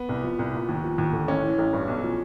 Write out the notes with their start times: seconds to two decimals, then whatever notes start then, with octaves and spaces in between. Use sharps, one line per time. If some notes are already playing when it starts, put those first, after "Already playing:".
Already playing: B3
0.09 C2
0.24 F3
0.39 C2
0.54 A#2
0.69 D#2
0.84 F3
0.98 D#2
1.13 D3
1.28 A1 C#4
1.43 E3
1.59 A1
1.73 G2
1.88 B1
2.03 F3